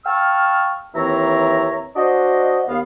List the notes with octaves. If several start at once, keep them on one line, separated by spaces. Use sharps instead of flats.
F5 G5 A5 C#6 E6 F6
D#2 E3 C4 C#5 E5 A#5
D4 F#4 C5 D#5
D#2 B3 F5